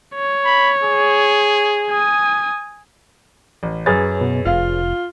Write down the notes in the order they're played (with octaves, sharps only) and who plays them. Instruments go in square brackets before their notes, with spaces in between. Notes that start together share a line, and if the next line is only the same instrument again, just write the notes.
[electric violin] C#5
[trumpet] B5
G#4
[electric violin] G#5 D#6
[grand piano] A1
[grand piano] F#2 A6 [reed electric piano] G#4 B4 C#5
[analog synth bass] B2
[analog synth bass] F1 [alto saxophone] F4 [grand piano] F5